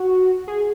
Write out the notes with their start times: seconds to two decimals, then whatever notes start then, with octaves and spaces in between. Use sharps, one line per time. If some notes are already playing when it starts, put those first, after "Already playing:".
Already playing: F#4
0.48 G#4